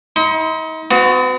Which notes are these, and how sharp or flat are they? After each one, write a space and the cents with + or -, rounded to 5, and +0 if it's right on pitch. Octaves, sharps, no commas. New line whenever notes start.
D#4 +40 C6 -20
B3 +45 F#4 -20